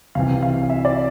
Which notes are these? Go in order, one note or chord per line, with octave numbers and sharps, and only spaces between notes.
C2 C3 E3 F5
F5
E5
D5